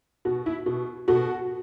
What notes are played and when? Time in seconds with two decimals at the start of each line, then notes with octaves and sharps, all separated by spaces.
0.25 B2 F#4
0.46 E4
0.66 B2
1.08 B2 F#4 A4